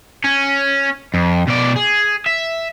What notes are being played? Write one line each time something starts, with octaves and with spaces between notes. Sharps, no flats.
C#4
F2
B2 D5
G#4
E5